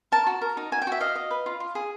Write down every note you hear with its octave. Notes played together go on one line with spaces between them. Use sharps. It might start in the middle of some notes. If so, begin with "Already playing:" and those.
A#4 A5
F#4
A#4
D#4
F#4 G#5
G5
F#4 E5
D#5 F5
D#5
B4
F4
F4
G#4